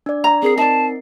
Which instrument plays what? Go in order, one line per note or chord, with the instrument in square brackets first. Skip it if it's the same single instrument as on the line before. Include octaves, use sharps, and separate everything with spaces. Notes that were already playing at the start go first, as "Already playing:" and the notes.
[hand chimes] D4 D5
[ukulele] A#5
[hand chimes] C4 A#4 C7 [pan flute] G#4
[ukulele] D#4 D5 [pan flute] A5